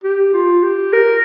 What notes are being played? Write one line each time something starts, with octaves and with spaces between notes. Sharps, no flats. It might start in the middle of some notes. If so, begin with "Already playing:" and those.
G4
F4
G4
A#4